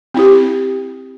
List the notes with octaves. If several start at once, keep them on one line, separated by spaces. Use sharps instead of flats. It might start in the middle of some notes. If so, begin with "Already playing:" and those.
C4 E4 G4